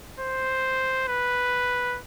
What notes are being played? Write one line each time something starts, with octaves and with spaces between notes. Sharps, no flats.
C5
B4